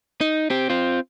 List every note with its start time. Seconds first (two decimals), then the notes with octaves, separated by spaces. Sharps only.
0.21 D#4
0.50 C4 G4
0.70 C4 F4